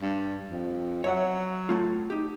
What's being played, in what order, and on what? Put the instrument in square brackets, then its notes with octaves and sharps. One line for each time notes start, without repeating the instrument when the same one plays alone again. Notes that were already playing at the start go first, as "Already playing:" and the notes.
[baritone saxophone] G2
F2
[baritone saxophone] F#3 [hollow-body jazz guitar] C#5 E5 F#5
[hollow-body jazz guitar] A2 A3 F4
D#4 G4